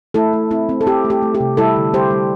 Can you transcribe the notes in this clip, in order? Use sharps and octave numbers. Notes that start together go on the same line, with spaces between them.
A3 E4 A4
A3
C4 E4
C4
A4
C4 G4
A3
G4
A3
G4
C3
G3 E4 A4
D3
G3 G4 C5
G3